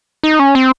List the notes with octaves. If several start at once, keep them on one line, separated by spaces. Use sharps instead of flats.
D#4
C#4
C4